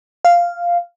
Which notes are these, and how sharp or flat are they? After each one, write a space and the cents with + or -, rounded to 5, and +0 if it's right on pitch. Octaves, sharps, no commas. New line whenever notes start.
F5 -5